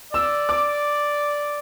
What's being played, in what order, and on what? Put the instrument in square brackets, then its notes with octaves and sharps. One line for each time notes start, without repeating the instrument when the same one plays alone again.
[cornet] D5 [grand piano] E6
[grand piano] D6